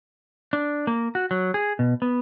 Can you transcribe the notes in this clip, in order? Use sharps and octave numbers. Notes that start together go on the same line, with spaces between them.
D4
A#3
F#4
F#3
G#4
B2
B3